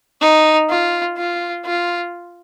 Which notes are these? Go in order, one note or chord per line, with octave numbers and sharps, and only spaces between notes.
D#4
F4
F4
F4